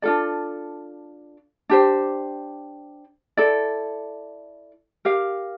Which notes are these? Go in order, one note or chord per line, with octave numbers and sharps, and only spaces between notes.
D4 F4 A4 D5
D4 G4 C5
E4 A4 D5
G4 A#4 F5